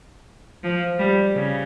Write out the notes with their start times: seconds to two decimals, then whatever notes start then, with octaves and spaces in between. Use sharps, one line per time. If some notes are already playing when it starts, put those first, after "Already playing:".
0.64 F3
0.99 G3
1.35 C#3